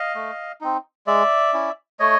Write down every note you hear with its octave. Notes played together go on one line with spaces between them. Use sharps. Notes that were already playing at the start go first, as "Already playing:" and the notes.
Already playing: D#5 F5
A3
C4 D#4
G#3 D5 E5
C#4 E4
A3 C#5 D#5